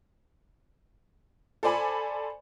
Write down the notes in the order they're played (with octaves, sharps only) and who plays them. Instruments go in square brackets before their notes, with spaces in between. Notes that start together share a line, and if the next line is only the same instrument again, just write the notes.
[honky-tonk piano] A4 C5 D5 G#5 B5